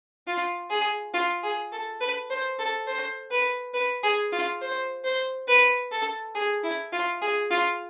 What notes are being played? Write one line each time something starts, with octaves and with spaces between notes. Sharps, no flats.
F4
G#4
F4
G#4
A4
B4
C5
A4
C5
B4
B4
G#4
F4
C5
C5
B4
A4
G#4
E4
F4
G#4
F4